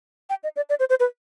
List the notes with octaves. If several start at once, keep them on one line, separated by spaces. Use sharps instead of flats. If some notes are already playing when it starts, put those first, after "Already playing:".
G5
D#5
D5
D5
C5
C5
B4